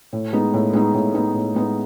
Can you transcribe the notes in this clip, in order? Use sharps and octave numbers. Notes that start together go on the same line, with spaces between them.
A2
G#3 B3 D#4
A2
G#3 B3 D#4
A2
G#3 B3 D#4
A2
G#3 B3 D#4